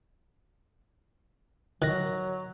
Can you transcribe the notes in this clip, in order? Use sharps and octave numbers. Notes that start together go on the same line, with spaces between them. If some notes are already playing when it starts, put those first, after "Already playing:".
D#3 F#3 F#6 A#6